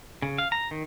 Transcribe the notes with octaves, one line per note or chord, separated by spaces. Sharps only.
C#3
F5
A#5
D#3